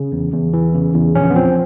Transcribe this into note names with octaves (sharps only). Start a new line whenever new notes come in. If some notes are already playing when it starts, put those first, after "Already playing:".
Already playing: C#3
E2
E2
E3
C#3
E2
A#1 C#4
B3
F3 C4